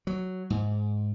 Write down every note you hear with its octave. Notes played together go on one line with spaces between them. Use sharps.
F#3
G#2